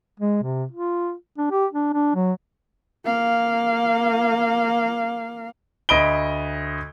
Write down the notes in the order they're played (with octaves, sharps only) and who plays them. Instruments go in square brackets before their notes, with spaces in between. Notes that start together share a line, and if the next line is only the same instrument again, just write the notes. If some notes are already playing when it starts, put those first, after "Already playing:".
[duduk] G#3
C3
F4
D4
G4
D4
D4
F#3
[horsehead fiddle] A#3 F5
[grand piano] D2 D#5 B5 D7 G7